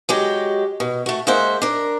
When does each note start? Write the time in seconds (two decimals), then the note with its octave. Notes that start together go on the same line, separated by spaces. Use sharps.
0.09 F#3 G#3 G4
0.80 B2
1.06 A3 F#4
1.27 G#3 A#3 C5 E5 F#5
1.62 D4 A#4